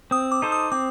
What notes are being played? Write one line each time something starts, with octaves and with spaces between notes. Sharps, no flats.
C4 D#6
D6
D#4 A4 C5
D#6
C4 D6